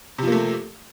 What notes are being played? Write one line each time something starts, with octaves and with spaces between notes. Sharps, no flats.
C3 F3 A3 A#3